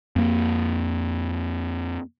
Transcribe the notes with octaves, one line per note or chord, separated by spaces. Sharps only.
F2 A#3